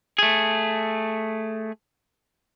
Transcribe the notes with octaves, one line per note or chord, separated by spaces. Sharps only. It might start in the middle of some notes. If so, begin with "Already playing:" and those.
A3 G#4